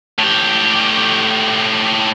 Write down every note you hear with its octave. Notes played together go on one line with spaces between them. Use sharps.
A2 G4